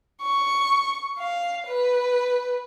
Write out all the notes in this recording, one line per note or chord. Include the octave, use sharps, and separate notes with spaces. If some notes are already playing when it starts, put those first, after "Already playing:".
C#6
F5
B4